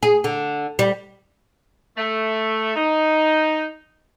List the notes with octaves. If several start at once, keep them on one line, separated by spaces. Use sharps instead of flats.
G#4
D3
G3
A3
D#4